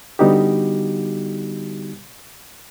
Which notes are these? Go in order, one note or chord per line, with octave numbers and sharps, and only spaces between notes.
D3 G3 B3 D#4 F#4 G4